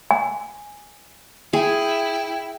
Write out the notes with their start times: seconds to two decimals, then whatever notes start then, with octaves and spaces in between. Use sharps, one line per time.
0.11 G#5
1.53 E4 G#4 G5